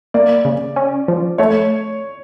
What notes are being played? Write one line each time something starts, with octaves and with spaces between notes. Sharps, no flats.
A#3 D5
C#3
C#4
F3
A3 C#5